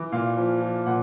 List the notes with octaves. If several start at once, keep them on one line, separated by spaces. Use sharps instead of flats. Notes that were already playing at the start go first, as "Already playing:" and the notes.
Already playing: E3
A#2 F5
F3
F3
A#2 F#5